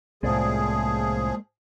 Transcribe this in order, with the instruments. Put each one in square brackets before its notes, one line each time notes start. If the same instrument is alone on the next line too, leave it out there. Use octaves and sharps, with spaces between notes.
[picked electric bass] C2 A2 [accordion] F3 G#4 [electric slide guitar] G#3 A#3 D5